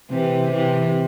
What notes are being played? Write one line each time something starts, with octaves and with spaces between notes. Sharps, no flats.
C3 E3
C3 E3